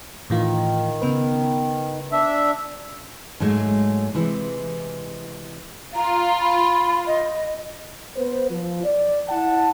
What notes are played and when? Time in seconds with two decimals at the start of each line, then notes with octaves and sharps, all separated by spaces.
0.30 A2 D#3 E3 F4
1.02 C#3 B3 B4
2.12 D4 E5
3.40 G#2 F#3 G#3 A3
4.15 C3 E3 G#3
5.95 F4 A#5
6.40 B5
7.07 D#5
8.16 B3 B4 C5
8.50 F3
8.84 D5
9.29 E4 F#5 A5